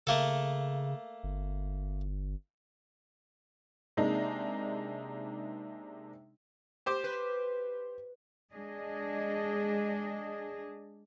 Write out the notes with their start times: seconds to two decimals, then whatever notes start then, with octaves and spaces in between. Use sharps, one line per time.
0.07 C#3 A3 A#3 A4
1.24 G1
3.97 C3 G#3 A#3 D4 D#4
6.86 G4 C5 D6
7.04 B4
8.52 G#3 D4 G#4 D#5